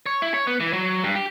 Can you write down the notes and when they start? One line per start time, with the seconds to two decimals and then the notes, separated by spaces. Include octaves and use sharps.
0.06 C#5
0.22 E4
0.34 C#5
0.47 B3
0.60 E3
0.73 F#3
1.04 G2
1.15 G4